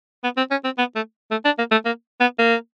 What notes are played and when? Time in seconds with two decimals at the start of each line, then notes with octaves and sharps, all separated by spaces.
0.24 B3
0.37 C4
0.51 C#4
0.64 C4
0.78 B3
0.95 A3
1.31 A3
1.45 D4
1.58 A#3
1.71 A3
1.85 A#3
2.20 B3
2.39 A#3